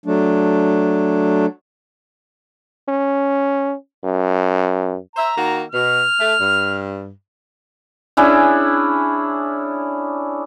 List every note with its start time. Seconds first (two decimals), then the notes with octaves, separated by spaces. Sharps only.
0.06 F#3 A3 D4
2.89 C#4
4.04 F#2
5.15 C5 E5 A#5
5.36 D#3 A#3 F#4
5.72 B2 F6
6.18 A3
6.39 G2
8.17 C#4 D4 E4 G#4